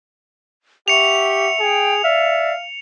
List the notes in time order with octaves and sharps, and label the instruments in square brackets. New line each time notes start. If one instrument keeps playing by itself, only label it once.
[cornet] G4 [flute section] E5 F#5 C#6 [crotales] C#7 F7
[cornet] G#4 [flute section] G5
[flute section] D5 [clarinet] E5 [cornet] F5